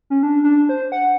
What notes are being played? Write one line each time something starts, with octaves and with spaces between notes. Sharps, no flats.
C#4
D4
D4
C5
F#5